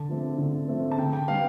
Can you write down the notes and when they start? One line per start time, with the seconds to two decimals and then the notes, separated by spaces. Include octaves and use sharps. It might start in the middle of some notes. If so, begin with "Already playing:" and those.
Already playing: D3 A5
0.09 F3 A3 C4
0.38 D3
0.68 F3 A3 C4
0.92 A5
0.98 D3 G5
1.13 G5
1.28 G3 B3 F5